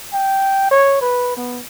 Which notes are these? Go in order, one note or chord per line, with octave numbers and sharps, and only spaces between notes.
G5
C#5
B4
B3